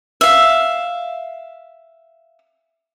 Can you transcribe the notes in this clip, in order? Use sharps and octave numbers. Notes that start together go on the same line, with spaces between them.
E5 F5